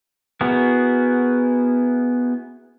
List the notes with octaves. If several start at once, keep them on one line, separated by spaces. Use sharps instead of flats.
B3 E4 F#4 G#4 A#4